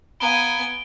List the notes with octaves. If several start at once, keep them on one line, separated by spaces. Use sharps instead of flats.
B3 F5 G#5 A#5 B5 D7 G7